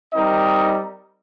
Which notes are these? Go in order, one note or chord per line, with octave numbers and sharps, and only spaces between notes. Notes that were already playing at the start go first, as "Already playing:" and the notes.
G3 C4 D#4 A#4 D#5